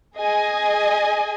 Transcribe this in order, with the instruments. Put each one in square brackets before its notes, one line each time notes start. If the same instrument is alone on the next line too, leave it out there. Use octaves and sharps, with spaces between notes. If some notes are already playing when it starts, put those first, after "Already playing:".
[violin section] G#4 D#5 G#5